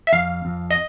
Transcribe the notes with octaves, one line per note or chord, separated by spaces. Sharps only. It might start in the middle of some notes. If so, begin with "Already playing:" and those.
E5
F2 F5
F2
D#5